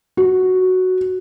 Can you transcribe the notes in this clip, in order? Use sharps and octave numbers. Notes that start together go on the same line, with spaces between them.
F#4